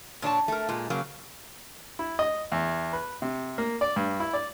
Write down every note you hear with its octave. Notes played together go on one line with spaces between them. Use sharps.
A#2 D4 C#5 A5
A3 A#4
A#2 G#3
C#3 F#3 A#3
E4
D#5
E2
B4
C3
A#3
D5
G2
E4
D5